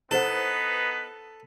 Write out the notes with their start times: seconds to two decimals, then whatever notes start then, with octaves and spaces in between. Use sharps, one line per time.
0.11 B3 D#4 E4 A4 B4 C5 F#5